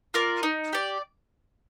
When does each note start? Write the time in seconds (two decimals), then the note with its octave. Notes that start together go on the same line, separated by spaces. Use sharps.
0.14 F4 A#4 D5
0.43 D#4
0.73 G4 D5